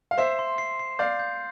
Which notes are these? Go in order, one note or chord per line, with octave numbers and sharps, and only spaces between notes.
F5
C5 E5 C7
C6
C7
C7
D5 F5 G6
G6